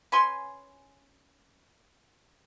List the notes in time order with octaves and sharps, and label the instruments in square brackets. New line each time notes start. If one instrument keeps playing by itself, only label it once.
[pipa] C#4 B4 G#5 C6